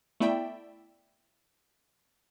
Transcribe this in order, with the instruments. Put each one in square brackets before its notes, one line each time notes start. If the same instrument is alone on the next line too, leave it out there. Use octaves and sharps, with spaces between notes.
[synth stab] A3 B3 E4 D5 E5 G5